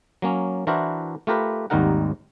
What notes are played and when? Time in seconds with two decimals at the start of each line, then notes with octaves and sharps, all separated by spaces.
0.22 F#3 A#3 C#4
0.67 E3 D4 E4 F#4 A#4 C5
1.27 A3 F4 G4 A#4 B4
1.70 G#1 D#2 G3 D#4 A#4 F#5